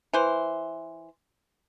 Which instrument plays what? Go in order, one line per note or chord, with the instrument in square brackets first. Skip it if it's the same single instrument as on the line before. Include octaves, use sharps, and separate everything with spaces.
[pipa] E3 C5